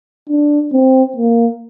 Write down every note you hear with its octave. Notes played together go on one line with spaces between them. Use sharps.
D4
C4
A#3